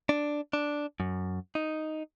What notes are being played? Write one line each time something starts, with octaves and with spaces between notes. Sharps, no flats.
D4
D4
F#2
D#4